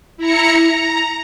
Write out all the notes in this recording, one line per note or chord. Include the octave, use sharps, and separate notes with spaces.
E4 A#5 C#7
A#5